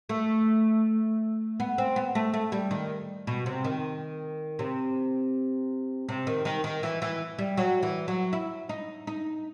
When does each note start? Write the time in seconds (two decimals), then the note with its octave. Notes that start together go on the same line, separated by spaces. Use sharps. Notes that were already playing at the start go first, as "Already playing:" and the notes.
0.09 A3
1.60 B3
1.78 C4
1.96 B3
2.15 A3
2.34 A3
2.52 G3
2.71 D#3
3.27 B2
3.46 C3
3.65 D#3
4.59 C3
6.09 C3
6.27 D#3
6.45 D#3
6.64 D#3
6.83 E3
7.02 E3
7.39 G3
7.57 F#3
7.83 E3
8.08 F#3
8.33 E4
8.69 D#4
9.07 D#4